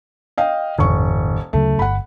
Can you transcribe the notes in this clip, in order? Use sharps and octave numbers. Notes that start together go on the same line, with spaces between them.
D#5 F5 G5
D#1 G#1 F2 C#3 C#6
D2 C#3 F#3 A3
G1 F#5 B5